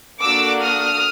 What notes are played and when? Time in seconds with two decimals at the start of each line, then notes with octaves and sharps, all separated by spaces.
0.22 A#3 D4 F#4 A4 D6 E6
0.62 D#6 F6